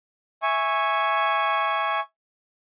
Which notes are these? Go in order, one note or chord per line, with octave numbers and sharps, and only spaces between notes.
E5 G#5 C#6